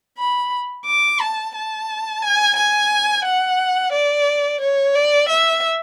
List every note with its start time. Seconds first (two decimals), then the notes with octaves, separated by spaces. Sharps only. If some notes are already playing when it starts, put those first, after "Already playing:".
0.18 B5
0.86 D6
1.20 A5
1.55 A5
2.22 G#5
2.56 G#5
3.25 F#5
3.92 D5
4.61 C#5
4.95 D5
5.29 E5